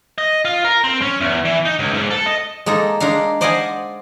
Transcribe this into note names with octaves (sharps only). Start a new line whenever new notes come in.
D#5
F4
A#4
C4
C#4
E2
E3
D#4
C#2
G#2
A4
D#5
G#3 A#3 D#4 A4
G#3 D4 D#4 F5
C5 D5 D#5 F5 F#5 G#5